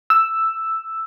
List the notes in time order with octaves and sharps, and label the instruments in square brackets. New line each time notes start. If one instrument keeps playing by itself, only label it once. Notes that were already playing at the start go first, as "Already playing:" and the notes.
[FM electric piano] E6